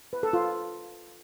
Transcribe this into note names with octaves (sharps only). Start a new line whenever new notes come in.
B4
A4
F4